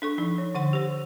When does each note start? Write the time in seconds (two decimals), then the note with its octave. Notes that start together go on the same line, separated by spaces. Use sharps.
0.02 D4 A4 C#6
0.18 F3 D#4
0.38 C#5
0.55 D3 F#5 C6
0.73 G4 C5